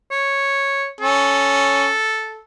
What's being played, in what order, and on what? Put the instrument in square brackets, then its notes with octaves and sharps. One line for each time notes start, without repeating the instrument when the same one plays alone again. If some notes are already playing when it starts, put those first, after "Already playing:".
[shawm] C#5
[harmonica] C#4 [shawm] A4